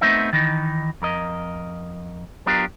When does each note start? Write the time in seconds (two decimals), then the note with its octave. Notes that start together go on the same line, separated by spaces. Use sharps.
0.01 A3 B3 C4 D#4 E5
0.33 D#3 E3 D#4
1.02 F2 A#4 D#5
2.46 F#3 B3 D4 F4 G4 A#4